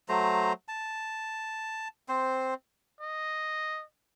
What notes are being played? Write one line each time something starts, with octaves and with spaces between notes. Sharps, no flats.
F#3 A3 C5 A#5
A5
C4 C5
D#5